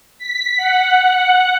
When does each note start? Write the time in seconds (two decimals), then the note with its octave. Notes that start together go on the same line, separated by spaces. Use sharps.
0.18 B6
0.57 F#5